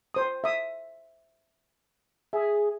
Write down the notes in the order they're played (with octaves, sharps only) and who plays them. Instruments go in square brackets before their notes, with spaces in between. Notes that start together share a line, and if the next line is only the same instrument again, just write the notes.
[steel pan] C5 D#6
E5 D#6
[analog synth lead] G#4 [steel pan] E5